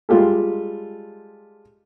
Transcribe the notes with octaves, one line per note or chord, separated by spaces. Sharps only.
G3 G#3 F4 G4 A4